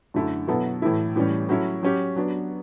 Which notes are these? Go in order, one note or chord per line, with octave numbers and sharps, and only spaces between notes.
F#2 D3 A3 E4
B2 F#3 B3 E4 A4
A2 E3 A3 E4
A2 E3 G3 C#4
F#3 A3 C#4 E4
F#3 C#4 G4
F#3 B3 D4